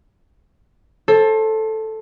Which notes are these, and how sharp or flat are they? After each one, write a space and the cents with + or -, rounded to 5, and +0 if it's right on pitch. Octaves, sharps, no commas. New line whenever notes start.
A4 +0 C5 +35